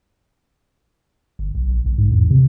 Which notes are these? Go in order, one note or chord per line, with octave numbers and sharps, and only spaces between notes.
G1
B1
A#1
A#1
G#2
E2
C3